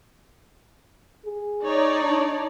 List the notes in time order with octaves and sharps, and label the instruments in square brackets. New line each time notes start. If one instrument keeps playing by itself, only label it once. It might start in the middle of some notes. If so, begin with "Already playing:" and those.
[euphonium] G#4
[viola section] D#4 C#5 D5
[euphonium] D4